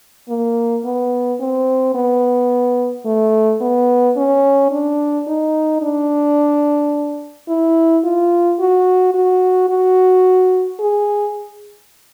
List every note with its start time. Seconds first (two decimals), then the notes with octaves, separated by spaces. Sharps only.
0.29 A#3
0.85 B3
1.40 C4
1.95 B3
3.06 A3
3.61 B3
4.17 C#4
4.71 D4
5.27 D#4
5.82 D4
7.48 E4
8.04 F4
8.60 F#4
9.14 F#4
9.69 F#4
10.80 G#4